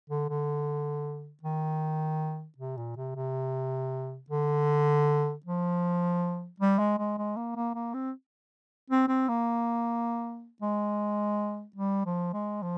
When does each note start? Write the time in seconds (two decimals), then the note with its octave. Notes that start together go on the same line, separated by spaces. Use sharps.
0.10 D3
0.30 D3
1.43 D#3
2.58 C3
2.77 A#2
2.97 C3
3.15 C3
4.30 D3
5.46 F3
6.60 G3
6.79 G#3
6.99 G#3
7.18 G#3
7.37 A#3
7.56 A#3
7.75 A#3
7.94 C4
8.90 C4
9.08 C4
9.29 A#3
10.62 G#3
11.76 G3
12.06 F3
12.33 G#3
12.62 F3